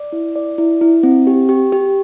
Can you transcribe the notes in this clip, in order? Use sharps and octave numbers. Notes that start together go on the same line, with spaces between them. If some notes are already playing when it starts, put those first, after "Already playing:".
Already playing: D5
E4
D5
E4
E4
C4
G4
G4
G4